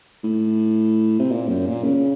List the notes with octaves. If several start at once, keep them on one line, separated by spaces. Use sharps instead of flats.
A2
C3
A#2
F#2
A#2
C#3